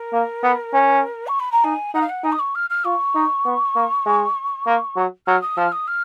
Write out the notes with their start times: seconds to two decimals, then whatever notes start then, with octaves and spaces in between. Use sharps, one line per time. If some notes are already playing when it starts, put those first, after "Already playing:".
Already playing: A#4
0.13 A#3
0.43 B3
0.73 C#4
1.27 C#6
1.40 B5
1.52 A#5
1.64 D#4 G#5
1.94 D#4 F#5
2.01 F5
2.09 F#5
2.24 D#4 G#5
2.32 D#6
2.39 C#6
2.55 F6
2.70 F6
2.85 F4 C#6
3.15 D#4
3.45 B3
3.75 A#3
4.06 G#3
4.66 A#3
4.96 F#3
5.27 F#3 F6
5.42 D#6
5.57 F3 F6
5.72 D#6
5.87 F6